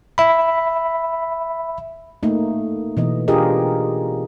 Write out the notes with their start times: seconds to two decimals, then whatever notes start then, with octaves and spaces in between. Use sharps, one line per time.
0.18 E5 B5
2.23 A3 A#3 D#4
2.97 B2 E3 D#5
3.28 D4 F4 G4 G#4 A#4 D#5